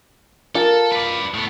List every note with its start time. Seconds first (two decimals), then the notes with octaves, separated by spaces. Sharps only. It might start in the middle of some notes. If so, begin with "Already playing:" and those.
0.55 F4 A4 A#4
0.92 B4 D5
1.34 A2 B3